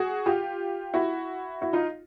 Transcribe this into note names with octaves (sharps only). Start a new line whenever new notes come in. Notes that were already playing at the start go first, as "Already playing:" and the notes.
Already playing: F#4 G#4
F4 G4
E4 F#4
E4 F#4
D#4 F4